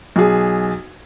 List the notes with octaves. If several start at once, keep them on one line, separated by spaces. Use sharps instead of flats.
B1 G#4